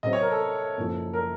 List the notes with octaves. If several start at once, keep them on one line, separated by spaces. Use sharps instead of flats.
C3 F#3 C4 D#5
C#5
A#4
A4
F#1 F#2 F3
A#4